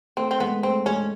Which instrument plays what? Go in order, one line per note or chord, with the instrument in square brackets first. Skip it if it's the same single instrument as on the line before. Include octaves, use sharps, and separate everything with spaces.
[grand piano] A3 [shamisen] C4
[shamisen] C4
[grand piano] G#3 [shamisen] B3
[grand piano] A3 [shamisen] C4
[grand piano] G#3 [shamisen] C#4